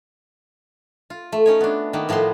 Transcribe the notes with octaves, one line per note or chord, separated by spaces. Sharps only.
F4
A3
C#4 D#4 C#5
B3 D4
D#3 A#3 B3
A2 F3 B3 A#5 C6